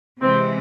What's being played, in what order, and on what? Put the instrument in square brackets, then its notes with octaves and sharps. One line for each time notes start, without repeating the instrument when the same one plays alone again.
[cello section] C3 E3 G#3 [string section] C4